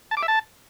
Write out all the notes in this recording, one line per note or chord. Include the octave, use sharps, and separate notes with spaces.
A5
D6
E5
A5